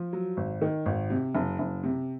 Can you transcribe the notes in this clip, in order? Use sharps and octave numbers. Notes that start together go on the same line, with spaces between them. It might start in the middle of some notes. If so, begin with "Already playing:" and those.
Already playing: F3
F#3
G#1
D#3
G#1
C3
F#1
F#1
C3